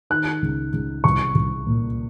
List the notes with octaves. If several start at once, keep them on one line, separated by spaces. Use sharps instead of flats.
D#3 F#6
C#2
C#2
C2 C#6
C2
A#2